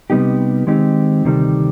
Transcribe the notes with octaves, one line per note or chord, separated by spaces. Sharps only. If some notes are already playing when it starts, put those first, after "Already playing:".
C3 G3 B3 D#4 G4
D#3 G#3 C4 D#4 G4
D2 C3 D#3 G3 C4